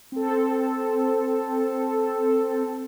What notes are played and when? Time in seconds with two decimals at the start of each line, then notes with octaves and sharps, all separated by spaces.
0.12 C4 A4